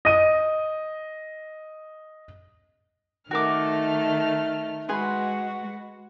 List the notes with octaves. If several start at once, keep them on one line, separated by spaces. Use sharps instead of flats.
D#5 D#7
D#3 A3 F#4 A#4 D6 F6
G#3 F#4 G#4 B4 C6